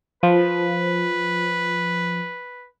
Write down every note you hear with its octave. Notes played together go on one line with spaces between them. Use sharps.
F3 B4